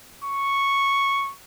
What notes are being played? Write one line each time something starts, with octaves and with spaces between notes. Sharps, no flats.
C#6